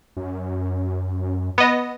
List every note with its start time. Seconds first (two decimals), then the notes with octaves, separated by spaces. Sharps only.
0.17 F#2
1.58 B3 D#5